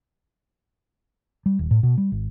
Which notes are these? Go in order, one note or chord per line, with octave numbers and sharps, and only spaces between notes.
G3
D#1
A2
B2
G3
G#1